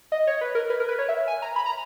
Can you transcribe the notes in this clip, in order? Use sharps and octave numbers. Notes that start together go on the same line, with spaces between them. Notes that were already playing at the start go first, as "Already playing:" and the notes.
D#5
C#5
B4
A#4
B4
A#4
B4
C#5
E5
G#5
A#5
B5
A#5